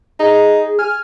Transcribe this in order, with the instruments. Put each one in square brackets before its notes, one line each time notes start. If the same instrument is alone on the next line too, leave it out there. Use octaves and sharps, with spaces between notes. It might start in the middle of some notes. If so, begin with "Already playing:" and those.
[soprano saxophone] D#4 [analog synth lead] G#4
[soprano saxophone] G#5 [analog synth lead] F6